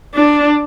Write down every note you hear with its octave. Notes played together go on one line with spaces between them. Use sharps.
D4